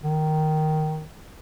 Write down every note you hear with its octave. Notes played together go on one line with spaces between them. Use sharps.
D#3